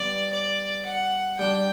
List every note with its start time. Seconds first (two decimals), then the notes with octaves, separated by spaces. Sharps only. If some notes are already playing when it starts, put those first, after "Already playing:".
Already playing: G3 B3 D5
0.33 D5
0.86 F#5
1.39 G3 D4 G4 G5